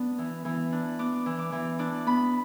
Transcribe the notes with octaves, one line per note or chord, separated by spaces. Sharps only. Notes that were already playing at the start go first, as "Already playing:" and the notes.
Already playing: B3 D4
E3
E3
D4
B3 D6
E3
D6
E3
D4 D6
B3 B5